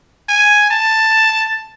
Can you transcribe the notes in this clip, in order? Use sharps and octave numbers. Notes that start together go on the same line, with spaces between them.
G#5
A5